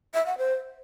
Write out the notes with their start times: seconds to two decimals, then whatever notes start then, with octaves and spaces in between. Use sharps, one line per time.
0.14 E5
0.26 F#5
0.38 C5